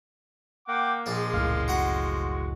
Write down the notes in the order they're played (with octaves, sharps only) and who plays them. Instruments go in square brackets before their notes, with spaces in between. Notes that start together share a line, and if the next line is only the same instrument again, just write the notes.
[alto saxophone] A#3 [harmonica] F#5 G5 D6
[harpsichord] A#1 D4 [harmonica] F3 G#3
[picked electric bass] F#1 C#2 A2 [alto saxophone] F5
[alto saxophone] F#4 [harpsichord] F#5 A#5